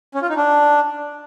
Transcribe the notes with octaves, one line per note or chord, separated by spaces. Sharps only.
C#4
F4
D#4
D4